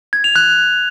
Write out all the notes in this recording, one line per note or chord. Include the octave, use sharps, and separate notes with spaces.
G#6
F7
F#6